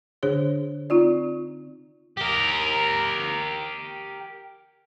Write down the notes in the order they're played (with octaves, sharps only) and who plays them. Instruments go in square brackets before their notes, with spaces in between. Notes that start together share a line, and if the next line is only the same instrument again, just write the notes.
[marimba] D3 D4 G#4 C5 C#5
C4 D#4 F4 D5
[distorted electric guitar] G4 A#4